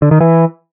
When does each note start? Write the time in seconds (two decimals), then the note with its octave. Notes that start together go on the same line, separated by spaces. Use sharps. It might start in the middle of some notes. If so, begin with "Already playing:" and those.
0.02 D3
0.11 D#3
0.21 E3